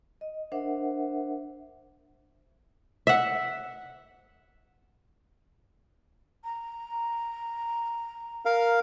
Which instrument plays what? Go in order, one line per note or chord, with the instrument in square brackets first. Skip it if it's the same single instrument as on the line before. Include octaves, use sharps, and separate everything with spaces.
[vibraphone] D#5
D4 A#4 C5 E5 F#5
[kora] E5 F#5
[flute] A#5
[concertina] A#4 F5